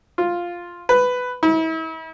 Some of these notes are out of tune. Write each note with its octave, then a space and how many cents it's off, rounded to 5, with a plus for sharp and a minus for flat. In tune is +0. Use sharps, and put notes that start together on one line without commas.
F4 +0
B4 +10
E4 -40